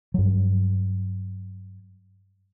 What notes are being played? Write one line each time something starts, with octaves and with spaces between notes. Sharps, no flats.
G2 F#3